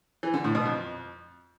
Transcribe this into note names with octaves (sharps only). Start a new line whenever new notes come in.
E3
D3
A2
B2
F2